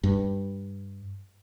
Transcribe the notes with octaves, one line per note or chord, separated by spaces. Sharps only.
G2